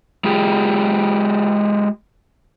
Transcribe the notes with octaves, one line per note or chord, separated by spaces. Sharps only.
G#3 F4 G4 G#4